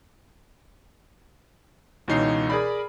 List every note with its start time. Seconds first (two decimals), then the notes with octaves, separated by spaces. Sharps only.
2.08 C#2 B2 E3 D#4 C#5 C7
2.50 G#4 A#4 D5 B5